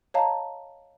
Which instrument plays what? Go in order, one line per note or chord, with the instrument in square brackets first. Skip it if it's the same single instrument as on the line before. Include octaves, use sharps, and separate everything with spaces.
[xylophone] C#5 D#5 F5 A5 A#5